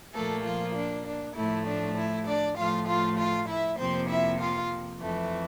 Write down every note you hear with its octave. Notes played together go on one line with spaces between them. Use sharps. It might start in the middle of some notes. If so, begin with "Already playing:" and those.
A#2 F3 A3 A#3 A4
F3 F4
D4
D4
A2 F3 A3 E4
D4
E4
D4 D5
A2 F3 A3 F4 F5
F4 F5
F4 F5
E4 E5
F2 C3 F3 A#3 C4 C5
E4 E5
F4 F5
F2 E3 A3